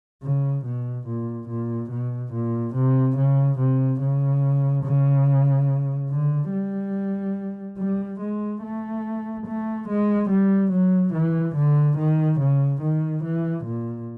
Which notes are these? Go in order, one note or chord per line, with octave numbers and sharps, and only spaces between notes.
C#3
B2
A#2
A#2
B2
A#2
C3
C#3
C3
C#3
C#3
D3
G3
G3
G#3
A3
A3
G#3
G3
F#3
E3
D3
D#3
C#3
D#3
E3
A#2